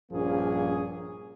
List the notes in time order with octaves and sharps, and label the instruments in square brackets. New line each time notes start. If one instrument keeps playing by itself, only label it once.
[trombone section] A#1 G2 F3 A#3 C#4 G#4